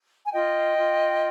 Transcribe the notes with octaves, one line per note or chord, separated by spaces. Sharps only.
G#5
F4 D#5 G5
F4